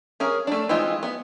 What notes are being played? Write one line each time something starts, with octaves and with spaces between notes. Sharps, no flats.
C#4 G#4 A#4
A3 D4
E3 G#3 C4 D#4 F4
B3